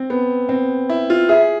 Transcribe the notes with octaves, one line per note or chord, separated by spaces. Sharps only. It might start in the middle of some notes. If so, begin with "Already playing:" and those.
Already playing: C4
B3
C4
E4
F4
G#4 E5